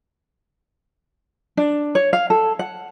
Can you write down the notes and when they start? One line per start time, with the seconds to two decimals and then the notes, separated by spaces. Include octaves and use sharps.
1.57 D4
1.95 C#5
2.13 F5
2.30 A4
2.59 F#5